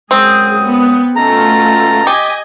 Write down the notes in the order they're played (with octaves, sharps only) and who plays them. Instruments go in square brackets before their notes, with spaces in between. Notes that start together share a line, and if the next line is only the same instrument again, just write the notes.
[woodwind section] F#2 G#3 D#6 [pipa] C4 [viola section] G#4
[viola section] B3
[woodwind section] B2 C#4 A5 [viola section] A3 F4 [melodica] A#5
[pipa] G4 [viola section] D#5 G#5